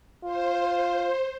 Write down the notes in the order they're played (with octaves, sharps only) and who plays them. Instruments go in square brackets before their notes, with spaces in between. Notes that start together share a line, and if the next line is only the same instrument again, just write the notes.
[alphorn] F4 [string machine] C5